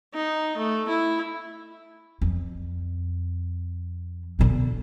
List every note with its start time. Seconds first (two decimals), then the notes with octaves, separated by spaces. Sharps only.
0.14 D#4
0.57 A3
0.88 E4
2.22 F2
4.39 B2 D3